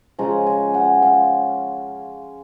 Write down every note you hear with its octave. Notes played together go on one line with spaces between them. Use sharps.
C#3 F3 G#3 C#4 A#5
G#5
F#5
F5